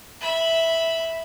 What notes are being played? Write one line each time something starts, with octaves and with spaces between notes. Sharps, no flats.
E5 B5